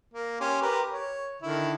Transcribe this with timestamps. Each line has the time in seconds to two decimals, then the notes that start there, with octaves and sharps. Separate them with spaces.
0.14 A#3
0.40 C#4 G4 C6
0.62 G4 A#4 B4
0.91 C#5
1.42 D3 D#3 E4